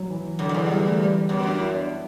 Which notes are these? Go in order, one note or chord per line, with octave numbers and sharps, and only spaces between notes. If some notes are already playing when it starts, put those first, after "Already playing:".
Already playing: F#3
E3
F#2 D3
F#2
E2 E3
G3
A3
G3
F#2 B3
D4
E4
D4